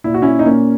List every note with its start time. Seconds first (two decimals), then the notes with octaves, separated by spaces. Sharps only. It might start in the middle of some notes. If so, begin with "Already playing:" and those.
0.04 A#2 E4
0.14 F#4
0.22 C#4 E4
0.39 D#4
0.46 A#2 A#3 C#4